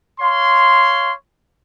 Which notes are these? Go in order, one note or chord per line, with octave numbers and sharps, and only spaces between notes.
C#5 F5 C6